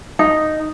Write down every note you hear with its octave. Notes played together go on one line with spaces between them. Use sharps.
D#4